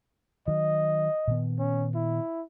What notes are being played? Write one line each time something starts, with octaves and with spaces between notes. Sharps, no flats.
D#3 F#3 D#5
A#2 D#3 B3
C#4
E4